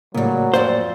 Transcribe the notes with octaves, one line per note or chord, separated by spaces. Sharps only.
A2 C#3 F#3 G3 A#3
F2 C5 D5 F5